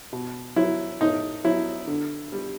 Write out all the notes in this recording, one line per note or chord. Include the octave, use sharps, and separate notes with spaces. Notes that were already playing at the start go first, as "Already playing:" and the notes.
B2
F#3 E4
A2 D#4
F#3 E4
D3
G3